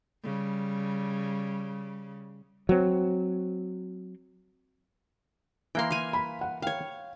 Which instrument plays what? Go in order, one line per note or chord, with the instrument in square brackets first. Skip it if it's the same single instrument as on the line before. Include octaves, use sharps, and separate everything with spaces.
[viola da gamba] C#3 G3
[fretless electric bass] F#3 C4
[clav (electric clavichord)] E3 A#3 A#4 [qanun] G5 C6
[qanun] F5 G#5
[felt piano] B5
F#5
[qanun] C#5 F5 [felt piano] G5